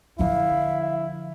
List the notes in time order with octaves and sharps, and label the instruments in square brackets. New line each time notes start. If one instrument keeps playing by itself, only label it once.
[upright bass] D3 F3 [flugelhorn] E4 [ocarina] F5